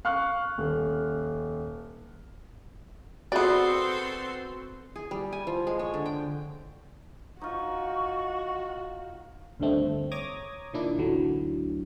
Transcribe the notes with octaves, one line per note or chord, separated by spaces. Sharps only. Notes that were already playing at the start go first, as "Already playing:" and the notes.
F5 C#6 F6 F#6
D#1
B3 C4 F#4 G#4 A4 D5 C6
G#4
G3
G#5
F3
G#3
C#5
D3
G5
D#4 F4 F#4 C#6
D2 G2 D3 D#3 A3 C4
C#5 A#5 D6 D#6 G#6 A#6
A#2 D#3 A#3 D4 E4
A1 D2 A2 D3 E3 F#3